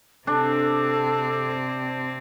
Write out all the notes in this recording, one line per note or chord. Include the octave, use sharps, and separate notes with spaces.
C3 C4 D4 A4